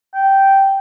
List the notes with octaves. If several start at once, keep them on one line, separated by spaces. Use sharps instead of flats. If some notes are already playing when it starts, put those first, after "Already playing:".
G5